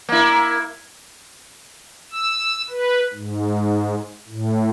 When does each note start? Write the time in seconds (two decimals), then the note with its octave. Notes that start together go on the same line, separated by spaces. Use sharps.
0.09 A#3 E4
2.12 E6
2.70 B4
3.14 G#2
4.28 A2